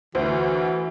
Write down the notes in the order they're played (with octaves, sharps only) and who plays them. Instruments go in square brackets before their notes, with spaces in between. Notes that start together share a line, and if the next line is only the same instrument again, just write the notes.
[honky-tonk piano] D2 [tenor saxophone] E3 [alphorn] F#4 [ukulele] C5